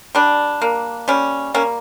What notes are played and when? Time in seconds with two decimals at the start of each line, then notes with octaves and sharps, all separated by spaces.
0.15 G3 D4
0.62 A#3
1.08 G3 C#4
1.54 A#3 C#4